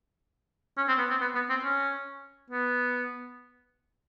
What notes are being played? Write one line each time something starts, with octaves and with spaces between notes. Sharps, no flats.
C#4
C4
B3
C4
B3
B3
C4
C#4
B3